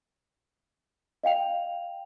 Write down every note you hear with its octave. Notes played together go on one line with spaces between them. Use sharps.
D#5 F5 G5 F7